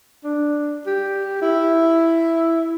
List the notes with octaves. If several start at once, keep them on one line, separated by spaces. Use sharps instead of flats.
D4
G4
E4